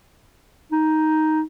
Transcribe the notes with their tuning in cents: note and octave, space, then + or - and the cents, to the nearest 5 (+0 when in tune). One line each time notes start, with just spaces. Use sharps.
D#4 +5